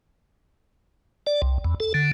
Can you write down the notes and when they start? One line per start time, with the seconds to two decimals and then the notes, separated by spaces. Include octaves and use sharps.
1.27 D5
1.42 C2
1.64 E2
1.80 A4
1.94 D3